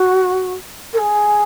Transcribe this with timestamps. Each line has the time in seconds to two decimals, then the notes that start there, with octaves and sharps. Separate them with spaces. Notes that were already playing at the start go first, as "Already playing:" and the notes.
Already playing: F#4
0.93 A#4
0.98 G#4